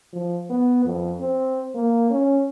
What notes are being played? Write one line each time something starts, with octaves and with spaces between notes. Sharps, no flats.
F3
B3
F2
C4
A#3
C#4